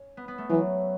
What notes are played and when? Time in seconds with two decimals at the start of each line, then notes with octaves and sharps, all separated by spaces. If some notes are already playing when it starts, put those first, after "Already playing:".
Already playing: C#4
0.17 B3
0.28 B3
0.38 A3
0.50 E3 F#3